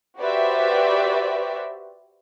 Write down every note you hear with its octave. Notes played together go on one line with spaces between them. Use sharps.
F#4 G4 B4 C5 D5 E5